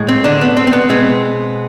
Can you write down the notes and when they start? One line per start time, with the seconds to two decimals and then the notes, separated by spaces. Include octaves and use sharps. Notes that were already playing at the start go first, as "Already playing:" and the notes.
Already playing: A2 G#3
0.09 C4
0.24 D3 D4
0.41 B3
0.57 C4
0.67 C4
0.73 B3
0.89 B2 G#3 B3 C4